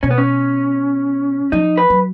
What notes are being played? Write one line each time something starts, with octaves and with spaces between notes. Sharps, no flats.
B2 C#4
B3
C#4
F3 D#4
B4
F#3